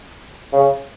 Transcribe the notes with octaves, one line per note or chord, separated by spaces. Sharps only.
C#3